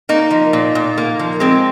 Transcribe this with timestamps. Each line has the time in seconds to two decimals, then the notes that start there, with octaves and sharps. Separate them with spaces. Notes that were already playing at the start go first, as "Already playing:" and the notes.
0.09 A#3 D#4
0.31 F3
0.53 A#2
0.75 A#2
0.98 A#3
1.19 F3
1.40 G#3 C4